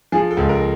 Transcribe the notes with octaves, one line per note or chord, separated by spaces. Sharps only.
F3 G#4
A4
C#2
A#4